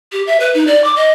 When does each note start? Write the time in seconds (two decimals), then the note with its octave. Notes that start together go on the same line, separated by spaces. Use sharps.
0.12 G4
0.27 E5
0.40 B4
0.55 D#4
0.67 D5
0.84 D6
0.96 D#5